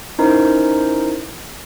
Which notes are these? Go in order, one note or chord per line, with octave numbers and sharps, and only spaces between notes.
C#4 D#4 E4 A#4 C5